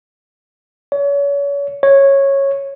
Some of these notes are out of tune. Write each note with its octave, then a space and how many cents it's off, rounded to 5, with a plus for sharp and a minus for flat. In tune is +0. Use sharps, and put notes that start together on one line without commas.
C#5 +35
C#5 -10